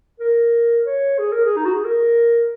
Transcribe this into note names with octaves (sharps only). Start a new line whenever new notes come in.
A#4
C#5
G#4
A#4
G#4
D#4
F#4
G#4
A#4